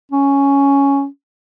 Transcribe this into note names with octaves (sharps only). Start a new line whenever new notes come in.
C#4